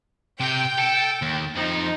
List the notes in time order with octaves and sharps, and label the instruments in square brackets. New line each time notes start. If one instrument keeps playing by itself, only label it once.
[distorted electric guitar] C3 [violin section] G5
[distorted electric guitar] A4
D#2
[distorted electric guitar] F2 F3 [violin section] D#4